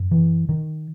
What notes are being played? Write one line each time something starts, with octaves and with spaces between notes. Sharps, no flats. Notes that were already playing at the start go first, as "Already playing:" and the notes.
Already playing: F#2
E3
D#3